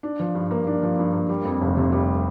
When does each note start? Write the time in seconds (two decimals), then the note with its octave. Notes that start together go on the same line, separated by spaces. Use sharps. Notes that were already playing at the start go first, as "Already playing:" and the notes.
0.03 D4
0.20 F3
0.35 G2
0.51 A#3
0.67 D4
0.83 F3
0.99 G2
1.13 A#3
1.29 G3
1.45 F2
1.62 F1
1.77 C3
1.92 G3